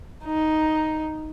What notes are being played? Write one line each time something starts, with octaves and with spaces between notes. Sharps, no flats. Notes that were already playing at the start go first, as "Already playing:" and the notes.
D#4